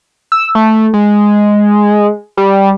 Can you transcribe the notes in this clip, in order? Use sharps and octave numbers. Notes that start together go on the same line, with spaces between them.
E6
A3
G#3
G3